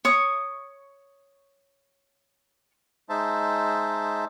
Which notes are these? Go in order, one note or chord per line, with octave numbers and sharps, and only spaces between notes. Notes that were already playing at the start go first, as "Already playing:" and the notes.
C#5 C#6 D#6
G#3 D#4 C5 E5 A5